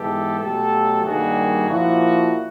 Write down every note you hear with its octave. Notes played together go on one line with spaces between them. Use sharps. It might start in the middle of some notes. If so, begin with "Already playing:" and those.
Already playing: G#2 E3 G#3 B3 G4 A4
B2 F#3 A3 G4 A4
G2 D#3 G3 A#3 F#4 G#4
A#2 F3 A#3 E4 F#4